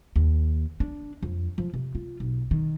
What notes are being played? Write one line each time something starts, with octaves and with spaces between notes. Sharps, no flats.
D#2
D4
F2
F3
C3
F4
B1
D#3